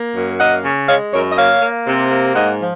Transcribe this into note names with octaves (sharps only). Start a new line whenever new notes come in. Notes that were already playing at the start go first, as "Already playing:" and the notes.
Already playing: A#3
F#2
A#3 D#5 F#5
C#3
G#3 C#5 F5
F#2 A#4 C#5
D#5
A#3 C#5 F5
A#3
C3
A#3
G#2 D#5 F#5
F3